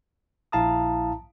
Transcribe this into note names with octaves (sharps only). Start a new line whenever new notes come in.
A#1 E4 F5 A5 A#5 D#6